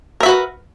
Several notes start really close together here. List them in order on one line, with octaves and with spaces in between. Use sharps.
A#4 E5 F#4 B4